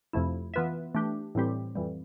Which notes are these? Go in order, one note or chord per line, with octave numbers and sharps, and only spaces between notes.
F2 C3 F3 A3 E4
E3 B3 F4 B4 E5
E3 A3 D4 G4
A2 E3 G3 C4 G4
F2 E3 G3